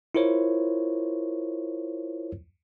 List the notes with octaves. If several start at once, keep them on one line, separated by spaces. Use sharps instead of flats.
E4 F4 A#4 C5 C#5